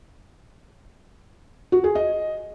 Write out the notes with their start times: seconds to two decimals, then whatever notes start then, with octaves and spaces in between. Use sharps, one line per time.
1.72 F#4
1.84 G#4
1.95 D#5